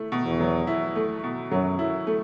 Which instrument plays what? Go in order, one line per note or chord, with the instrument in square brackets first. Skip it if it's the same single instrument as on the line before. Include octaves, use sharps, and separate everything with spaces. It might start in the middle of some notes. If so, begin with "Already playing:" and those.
Already playing: [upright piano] A3 E4
B2
[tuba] E2
[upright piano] F#3
E4
A3
B2
[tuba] F#2 [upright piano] F#3
[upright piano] E4
A3